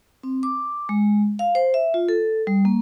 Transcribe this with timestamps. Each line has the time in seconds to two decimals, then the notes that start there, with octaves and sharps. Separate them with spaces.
0.23 C4
0.43 D6
0.89 G#3
1.39 F5
1.55 C5
1.74 E5
1.94 F4
2.09 A4
2.47 G3
2.65 A#3